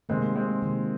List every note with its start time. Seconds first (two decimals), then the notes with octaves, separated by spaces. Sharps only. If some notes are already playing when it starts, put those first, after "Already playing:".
0.09 C3 D#3 G#3 A#3 C4
0.35 G#3 C4
0.62 C3 D#3 A#3